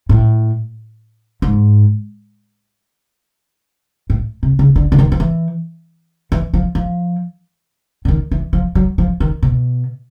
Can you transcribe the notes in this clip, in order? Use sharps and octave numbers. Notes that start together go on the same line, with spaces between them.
A2
G#2
A2
C3
C#3
D3
D3
D#3
F3
E3
E3
F3
F3
D3
D#3
E3
F3
F#3
F3
D#3
B2